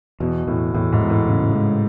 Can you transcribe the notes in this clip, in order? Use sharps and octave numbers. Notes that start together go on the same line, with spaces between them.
E2 B2
E2 A2
E2 A2
G#2
E2
A2
C#3
G#3